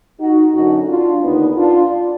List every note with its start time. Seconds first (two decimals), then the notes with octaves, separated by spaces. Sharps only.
0.20 D#4 F#4
0.54 F#2 D3 D#4 F#4
0.88 D4 F4
1.23 D#2 D3 B3 D#4
1.57 D4 F4